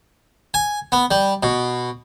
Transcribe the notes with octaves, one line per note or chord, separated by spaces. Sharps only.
G#5
B3
G3
B2